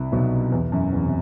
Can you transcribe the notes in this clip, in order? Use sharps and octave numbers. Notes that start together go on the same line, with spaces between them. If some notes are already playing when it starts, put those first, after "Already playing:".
Already playing: C2 C3
B1 B2
E2
F#2
E2
C3